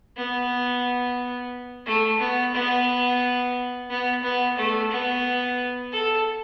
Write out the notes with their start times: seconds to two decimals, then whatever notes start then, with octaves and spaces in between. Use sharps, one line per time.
0.17 B3
1.86 A3
2.20 B3
2.54 B3
3.90 B3
4.23 B3
4.57 A3
4.91 B3
5.92 A4